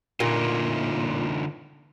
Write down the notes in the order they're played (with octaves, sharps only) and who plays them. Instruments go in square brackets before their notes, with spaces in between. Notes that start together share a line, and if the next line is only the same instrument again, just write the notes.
[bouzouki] A#2 [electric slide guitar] D3 D#4 F4